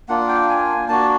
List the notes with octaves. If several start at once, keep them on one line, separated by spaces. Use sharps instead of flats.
A#3 D4 F4 F#5
G5
G#5
A#3 D4 F#4 A5